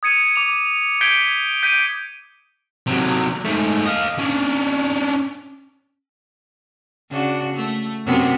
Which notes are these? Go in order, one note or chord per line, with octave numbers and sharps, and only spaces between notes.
D#6 G#6 C#7 D#7
D6 F7
G6 G#6 B6 D7 G7
G6 B6 D7 D#7
C3 F#3
G#2 A3
D#5 F5
C#4 D4
C#3 D4 F#4
A3
F#2 C3 B3